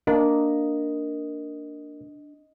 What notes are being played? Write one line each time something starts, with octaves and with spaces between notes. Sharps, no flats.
A#3 D4 D#5